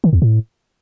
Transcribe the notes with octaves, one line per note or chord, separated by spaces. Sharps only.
D#3
E2
A2